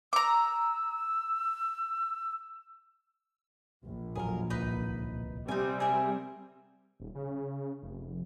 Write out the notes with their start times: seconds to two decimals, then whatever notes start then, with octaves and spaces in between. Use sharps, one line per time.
0.13 A#5 D6 E6
3.83 A#1
4.15 E1 A1 F#3 G#4 A#4
4.50 D1 C2 D#4 B4
5.48 C3 G3 C4 D#4 G#5
5.80 G#4 A#4 E5
7.00 D#1
7.15 C#3
7.83 F1